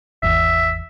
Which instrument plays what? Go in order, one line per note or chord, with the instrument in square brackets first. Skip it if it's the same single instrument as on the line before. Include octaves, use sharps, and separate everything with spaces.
[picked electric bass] G#1 E2 [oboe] E5